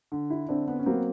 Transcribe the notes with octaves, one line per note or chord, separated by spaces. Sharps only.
D3
E4
D3 C4 D4
B3
C#4
F#3 A#3 C4